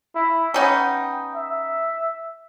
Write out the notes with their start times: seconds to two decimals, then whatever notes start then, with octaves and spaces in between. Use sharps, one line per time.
0.15 E4
0.54 B3 C#4 D#4 G5
1.35 E5